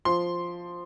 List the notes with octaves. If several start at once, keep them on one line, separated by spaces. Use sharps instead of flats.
F3 C6